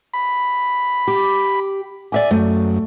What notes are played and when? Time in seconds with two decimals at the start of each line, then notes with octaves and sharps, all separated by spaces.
0.14 B5
1.08 G4
2.12 D5 E5 G#5
2.31 F#2 A3